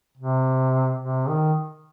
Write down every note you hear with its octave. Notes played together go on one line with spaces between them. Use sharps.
C3
C3
D#3